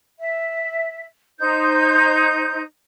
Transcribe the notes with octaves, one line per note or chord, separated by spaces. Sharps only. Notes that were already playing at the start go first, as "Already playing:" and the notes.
E5
D#4 C5 G6